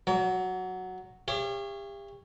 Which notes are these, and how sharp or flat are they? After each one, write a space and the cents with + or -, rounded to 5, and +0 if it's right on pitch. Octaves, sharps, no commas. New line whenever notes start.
F#3 +0 C#5 +45
G4 +35 C#5 +0 F5 -45